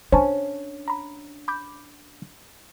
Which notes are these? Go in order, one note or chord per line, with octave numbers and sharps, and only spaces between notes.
C#4 D4 C5 G#5 A5
A#5 B5
B5 D6 G6